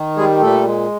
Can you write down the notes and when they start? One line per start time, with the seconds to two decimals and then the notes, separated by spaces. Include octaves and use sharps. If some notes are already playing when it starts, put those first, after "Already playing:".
Already playing: D#3
0.17 G3 G#3 G#4
0.41 A#2 A3 A4
0.66 G#3